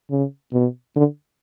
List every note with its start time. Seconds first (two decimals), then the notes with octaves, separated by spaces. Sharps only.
0.10 C#3
0.53 B2
0.96 D3